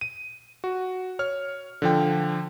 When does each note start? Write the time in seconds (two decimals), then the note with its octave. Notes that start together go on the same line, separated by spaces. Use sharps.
0.01 D#7
0.64 F#4
1.19 C#5 F6
1.82 D3 F3 G5